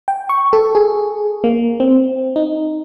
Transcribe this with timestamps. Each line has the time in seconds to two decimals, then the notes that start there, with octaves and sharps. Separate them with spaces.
0.08 G5
0.29 C#6
0.53 A4
0.75 G#4
1.44 A#3
1.80 C4
2.36 D#4